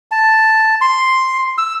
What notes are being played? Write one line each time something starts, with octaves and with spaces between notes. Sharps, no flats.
A5
C6
E6